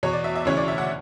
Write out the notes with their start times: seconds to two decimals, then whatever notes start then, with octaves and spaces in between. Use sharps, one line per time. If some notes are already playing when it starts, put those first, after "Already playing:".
0.03 E2 B2 C#5
0.13 D5
0.24 E5
0.35 E5
0.45 D2 C#3 E3 C#5
0.57 D5
0.68 E5
0.78 F#5